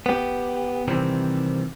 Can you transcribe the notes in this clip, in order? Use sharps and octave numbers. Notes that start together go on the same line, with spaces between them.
B3 G4
C3 D#3 E3 G3 C4